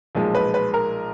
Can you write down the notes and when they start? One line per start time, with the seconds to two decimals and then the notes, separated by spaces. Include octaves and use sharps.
0.15 B1 A#2 F3 G#3
0.35 B4
0.54 B4
0.74 A#4